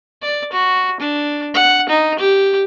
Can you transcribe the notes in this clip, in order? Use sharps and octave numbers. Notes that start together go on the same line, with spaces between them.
D5
F#4
D4
F#5
D#4
G4